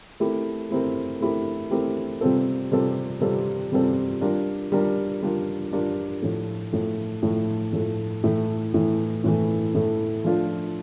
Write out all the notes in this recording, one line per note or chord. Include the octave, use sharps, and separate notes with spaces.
A3 C4 E4 G4 A#4
A3 C4 E4 G4 A#4
A3 C4 E4 G4 A#4
A3 C4 E4 G4 A#4
C3 G3 C4 F4 A4
C3 G3 C4 F4 A4
C3 G3 C4 F4 A4
C3 G3 C4 F4 A4
G3 D4 F4 A#4
G3 D4 F4 A#4
G3 D4 F4 A#4
G3 D4 F4 A#4
A2 F3 A3
A2 F3 A3
A2 F3 A3
A2 F3 A3
A2 E3 A3
A2 E3 A3
A2 E3 A3
A2 E3 A3
F3 A3 D4 F4 A4